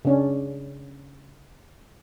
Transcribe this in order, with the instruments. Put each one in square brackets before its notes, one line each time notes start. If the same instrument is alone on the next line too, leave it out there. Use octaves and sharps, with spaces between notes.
[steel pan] C#3 C#4 D4